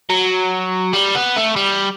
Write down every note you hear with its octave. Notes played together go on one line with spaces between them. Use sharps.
F#3
G3
B3
A3
G3